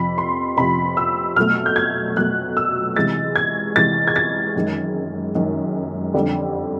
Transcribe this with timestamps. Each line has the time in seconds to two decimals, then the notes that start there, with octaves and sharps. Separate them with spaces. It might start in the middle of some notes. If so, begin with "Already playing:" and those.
Already playing: F2 C3 F3 B5
0.18 C6
0.57 F2 C3 F3 B5
0.97 E6
1.36 B2 F#3 A3 F6
1.66 G6
1.76 G#6
2.16 B2 F#3 A3 F#6
2.57 E6
2.96 C3 E3 G#3 A6
3.36 G#6
3.75 C3 E3 G#3 A6
4.08 G#6
4.16 A6
4.56 F#2 D#3 G#3
5.35 F#2 D#3 G#3
6.14 F2 D3 G3